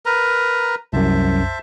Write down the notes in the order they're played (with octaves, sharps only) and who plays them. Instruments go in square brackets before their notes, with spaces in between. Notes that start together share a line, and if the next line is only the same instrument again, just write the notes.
[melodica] A#4 B4 A#5
[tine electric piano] C2 F#2 [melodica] C5 E5 A5